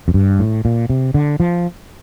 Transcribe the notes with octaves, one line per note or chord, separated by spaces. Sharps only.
F2
G2
A2
A#2
C3
D3
F3